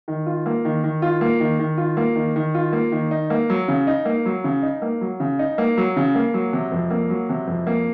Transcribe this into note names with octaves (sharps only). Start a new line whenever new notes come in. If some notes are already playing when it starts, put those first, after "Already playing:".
D#3
F4
A#3
D#3
D#3
F4
A#3
D#3
D#3
F4
A#3
D#3
D#3
F4
A#3
D#3
D#4
A#3
F#3
C#3
D#4
A#3
F#3
C#3
D#4
A#3
F#3
C#3
D#4
A#3
F#3
C#3
A#3
F#3
C3
F2
A#3
F#3
C3
F2
A#3